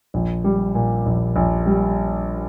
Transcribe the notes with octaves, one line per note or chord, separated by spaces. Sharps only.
A#1
G3
A#2
A#1
A#1
G3